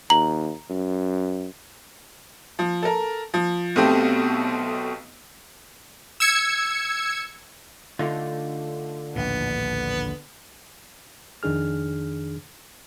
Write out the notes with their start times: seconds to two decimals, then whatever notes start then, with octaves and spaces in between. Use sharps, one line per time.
0.10 D#2 A#5 F#7
0.70 F#2
2.59 F3
2.83 A4 A#4
3.34 F3
3.76 B1 B2 A3 C4 G4
6.20 E6 G#6 C#7
7.99 D3 A3 D#4 F4
9.16 A#1 D#2 A2 B3
11.43 F2 D#3 D4 G#4 F6